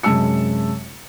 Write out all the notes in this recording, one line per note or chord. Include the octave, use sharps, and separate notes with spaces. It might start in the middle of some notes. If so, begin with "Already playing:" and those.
F#2 C3 G#3 A5 E6 C#7